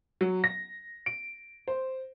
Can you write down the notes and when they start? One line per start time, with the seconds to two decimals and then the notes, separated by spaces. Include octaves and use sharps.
0.21 F#3
0.44 A#6
1.06 D7
1.68 C5